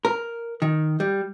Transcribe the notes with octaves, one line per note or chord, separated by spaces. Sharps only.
A#4
D#3
G3